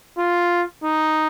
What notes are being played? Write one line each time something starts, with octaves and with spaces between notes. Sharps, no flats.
F4
D#4